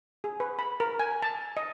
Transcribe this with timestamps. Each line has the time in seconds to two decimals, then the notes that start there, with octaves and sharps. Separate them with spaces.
0.24 G#4
0.40 B4
0.59 B5
0.80 A#4
0.99 G#5
1.22 A5
1.57 D#5